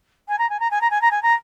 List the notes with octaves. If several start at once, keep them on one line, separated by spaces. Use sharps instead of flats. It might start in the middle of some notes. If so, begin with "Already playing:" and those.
G#5
A#5
G#5
A#5
G#5
A#5
G#5
A#5
G#5
A#5